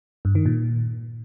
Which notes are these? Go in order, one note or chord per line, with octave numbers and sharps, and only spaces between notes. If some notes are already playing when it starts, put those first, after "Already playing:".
G2
D#3
A#2